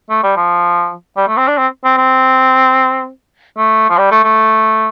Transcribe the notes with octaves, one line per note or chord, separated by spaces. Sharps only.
A3
G3
F3
G3
A3
C4
D4
C4
C4
C4
A3
F3
G3
A3
A3